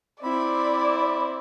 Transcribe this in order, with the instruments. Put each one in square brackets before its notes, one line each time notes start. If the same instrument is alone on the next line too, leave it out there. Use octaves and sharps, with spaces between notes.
[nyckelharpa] C4 E4 [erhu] D5 [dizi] B5